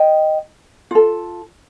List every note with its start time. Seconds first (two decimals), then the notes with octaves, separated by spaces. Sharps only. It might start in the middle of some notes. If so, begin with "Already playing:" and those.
Already playing: D#5 G5
0.91 F4 A4